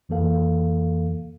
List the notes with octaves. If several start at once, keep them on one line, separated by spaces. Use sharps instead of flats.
F2 E3 A#3 A4 F5